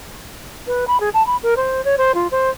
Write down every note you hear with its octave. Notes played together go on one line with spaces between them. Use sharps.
B4
B5
G#4
A5
B5
A#4
C5
C#5
C5
F4
C5